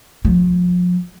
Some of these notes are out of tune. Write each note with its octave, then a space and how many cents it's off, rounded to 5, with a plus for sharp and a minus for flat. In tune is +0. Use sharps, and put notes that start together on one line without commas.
F3 +35